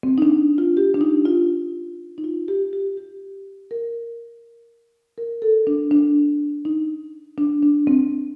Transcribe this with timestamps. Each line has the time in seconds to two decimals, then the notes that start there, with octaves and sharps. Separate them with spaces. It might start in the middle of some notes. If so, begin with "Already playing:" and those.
0.03 C4
0.18 D#4
0.22 D4
0.58 F4
0.77 G4
0.94 D4
1.01 D#4
1.25 F4
2.18 D#4
2.24 F4
2.48 G4
2.73 G4
2.97 G4
3.71 A#4
5.18 A#4
5.42 A4
5.67 D4
5.91 D4
6.65 D#4
7.38 D4
7.63 D4
7.87 C4